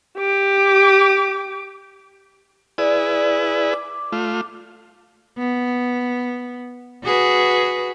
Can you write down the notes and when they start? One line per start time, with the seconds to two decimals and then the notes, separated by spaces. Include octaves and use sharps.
0.18 G4 D6
2.78 E4 G#4 B4 D5
3.73 D6
4.12 A3 F4
5.38 B3
7.04 F#4 G#4 B4